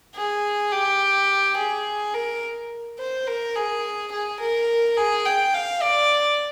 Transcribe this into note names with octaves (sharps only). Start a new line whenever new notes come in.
G#4
G4
G#4
A#4
C5
A#4
G#4
G#4
A#4
G#4
G5
F5
D5